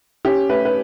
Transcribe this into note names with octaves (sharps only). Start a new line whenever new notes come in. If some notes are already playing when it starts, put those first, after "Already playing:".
C#4 G4
A3 B4
B4